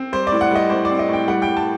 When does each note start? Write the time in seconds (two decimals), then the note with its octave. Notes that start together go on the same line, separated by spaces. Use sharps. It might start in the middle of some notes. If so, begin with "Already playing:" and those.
Already playing: C4
0.12 G3 C5
0.27 D5
0.32 A2
0.41 F#5
0.51 G3 D#5
0.70 A2 C5
0.85 C4 D5
0.99 D#5
1.09 A2 G5
1.28 G3 F#5
1.42 G5
1.47 G3
1.57 A5